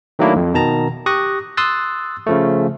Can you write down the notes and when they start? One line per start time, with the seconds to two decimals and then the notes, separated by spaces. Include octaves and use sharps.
0.19 D#3 F#3 A3 A#3 D4 E4
0.36 F2
0.54 B2 D#3 A5 A#5
1.06 G4 C#6 D#6 F#6 A#6
1.57 C6 D#6 E6 F#6 A6
2.27 C#3 F3 A3